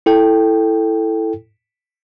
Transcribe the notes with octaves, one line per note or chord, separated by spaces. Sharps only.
E4 A4 G5